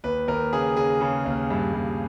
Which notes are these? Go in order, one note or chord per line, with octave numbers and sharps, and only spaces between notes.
D#2 B4
D#2 A#4
C#3 G#4
C#3 G#4
C#3
D#2
G2
G2